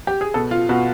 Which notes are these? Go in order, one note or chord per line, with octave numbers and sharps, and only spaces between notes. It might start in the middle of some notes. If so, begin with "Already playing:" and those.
G4
G#4
B2 A4
F4
B2 F#4